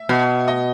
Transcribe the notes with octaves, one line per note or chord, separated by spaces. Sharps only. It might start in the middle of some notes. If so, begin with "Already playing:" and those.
Already playing: E5
B2
D#5